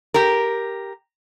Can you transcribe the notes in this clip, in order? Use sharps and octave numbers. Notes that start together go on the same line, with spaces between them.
G4 A#4